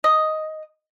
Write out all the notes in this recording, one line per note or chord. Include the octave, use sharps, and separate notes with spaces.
D#5